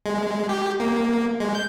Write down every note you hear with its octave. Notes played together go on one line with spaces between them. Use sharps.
G#3
G4
A#3
G#3
G6